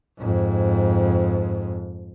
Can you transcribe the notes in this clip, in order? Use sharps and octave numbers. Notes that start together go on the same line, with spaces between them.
F2 G#2